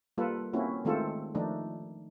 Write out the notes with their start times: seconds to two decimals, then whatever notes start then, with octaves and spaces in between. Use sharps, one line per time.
0.18 G3 A#3 F4 A4 B4
0.53 A#3 C4 C#4 E4 F#4
0.85 D#3 G#3 A3 C4 F4 A4
1.35 D#3 F3 A3 D4 D#4